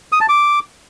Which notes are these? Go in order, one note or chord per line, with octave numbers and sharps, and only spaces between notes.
D#6
A5
D6